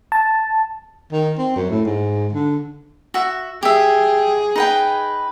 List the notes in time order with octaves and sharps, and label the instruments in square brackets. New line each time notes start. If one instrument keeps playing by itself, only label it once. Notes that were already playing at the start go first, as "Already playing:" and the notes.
[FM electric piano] A5
[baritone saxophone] D#3
C4
F#2
A2
G#2
D3
[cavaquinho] F#4 E5
[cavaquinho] G4 E5 [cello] G#4
[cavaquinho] D#4 B4 G5